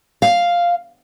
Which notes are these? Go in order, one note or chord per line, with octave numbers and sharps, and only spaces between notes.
F5